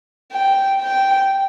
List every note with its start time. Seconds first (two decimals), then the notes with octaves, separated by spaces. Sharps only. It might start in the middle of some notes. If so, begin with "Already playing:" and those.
0.32 G5
0.81 G5